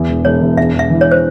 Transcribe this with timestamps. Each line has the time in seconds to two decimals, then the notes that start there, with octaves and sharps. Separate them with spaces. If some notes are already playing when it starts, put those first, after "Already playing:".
Already playing: E2
0.09 E1
0.25 E1 C#5
0.41 E2
0.57 E1 E5
0.73 E1
0.79 E5
0.90 E3
1.01 C#5
1.11 C5